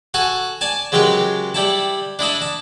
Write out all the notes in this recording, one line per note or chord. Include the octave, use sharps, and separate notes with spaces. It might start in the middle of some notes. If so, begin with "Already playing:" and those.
F#4 A4 G#5 C#6
D5 G#5 A5
C#3 F#3 G#3 G4 A#4 B4
G3 E4 A5
D4 E4 D#5 A5
A5